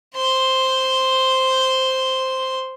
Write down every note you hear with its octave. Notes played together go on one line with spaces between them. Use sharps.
C5 C6